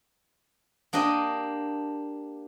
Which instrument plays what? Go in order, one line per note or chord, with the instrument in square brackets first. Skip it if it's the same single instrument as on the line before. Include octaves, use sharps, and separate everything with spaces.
[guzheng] A#3 D4 G4 D#5